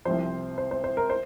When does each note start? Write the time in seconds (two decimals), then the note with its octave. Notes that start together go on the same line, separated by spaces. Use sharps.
0.05 C2 C3 F3 C5
0.58 C5
0.71 C5
0.84 C5
0.97 A#4
1.10 C5